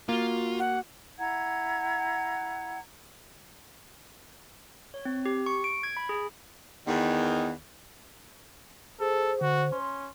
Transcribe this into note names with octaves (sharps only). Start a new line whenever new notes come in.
A#3 F4 F#4
F#5
E4 F#5 A#5 G#6
C#5
C4
G4
C#6
D7
G#6
B5
G#4
E2 D#3
G#4 A4 C5
D3 F#4
C#4 C6